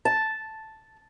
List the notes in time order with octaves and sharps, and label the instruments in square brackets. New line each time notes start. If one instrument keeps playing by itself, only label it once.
[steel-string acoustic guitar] A5